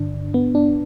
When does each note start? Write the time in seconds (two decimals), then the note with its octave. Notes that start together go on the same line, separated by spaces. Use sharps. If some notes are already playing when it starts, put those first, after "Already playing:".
Already playing: G2 D3 D4
0.34 B3
0.55 D4